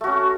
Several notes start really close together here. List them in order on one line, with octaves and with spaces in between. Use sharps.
A3 F#4 C#4